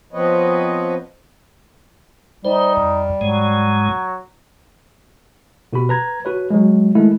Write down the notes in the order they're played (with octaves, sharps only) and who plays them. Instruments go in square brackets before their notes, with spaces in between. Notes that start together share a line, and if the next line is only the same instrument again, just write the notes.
[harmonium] F3 B3 C4 B4 C#5 D#5
[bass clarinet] G3 [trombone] D#4 [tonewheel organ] C5
[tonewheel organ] F2
[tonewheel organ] G#2 G#3 [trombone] F#3
[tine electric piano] B2 F#4 G4 B5
B4 A#5 G#6
F#4 B4 C#5
F#3 G#3
D#3 G#3 A3 E4